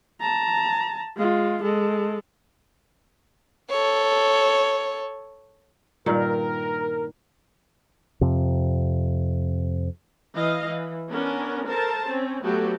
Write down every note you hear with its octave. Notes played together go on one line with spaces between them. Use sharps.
A5 A#5
G#3 F4
G#3 A4
A4 C#5
G2 A#2 D#3 A#4
F2 C3
E3 D#5 F5
E3
B3 C#4 D4 A#4
A4 A#4 C5 A5
C4 C#4
F#3 A3 B3 F#4 G4 A4